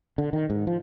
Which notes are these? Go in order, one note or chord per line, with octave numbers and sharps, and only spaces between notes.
D3
D#3
G#2
F3